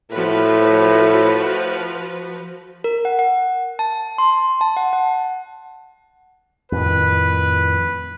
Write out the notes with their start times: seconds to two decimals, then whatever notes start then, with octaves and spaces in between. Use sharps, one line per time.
0.12 A2 F3 F#4 B4
2.84 A#4
3.05 F#5
3.19 F#5
3.79 A5
4.18 C6
4.61 A5
4.77 F#5
4.93 F#5
6.72 F2 A2 D#3 B4